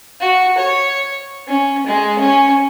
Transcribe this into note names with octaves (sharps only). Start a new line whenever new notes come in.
F#4
C#5
C#4
G#3
C#4